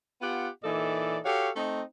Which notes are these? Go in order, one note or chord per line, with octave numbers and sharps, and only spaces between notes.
B3 F4 G4 F#5
A#2 E3 D#4 A4 D5
F#4 G4 A4 C#5 F5
A3 C4 D#4